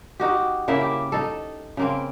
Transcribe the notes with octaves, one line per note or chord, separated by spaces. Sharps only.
D#4 F#4 G4
C#3 A#3 E4 E5
G4
D#4 A4
C#3 A#3 C4